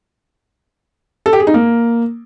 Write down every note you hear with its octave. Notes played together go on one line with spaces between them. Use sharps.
A4
G4
G#4
D#4
A#3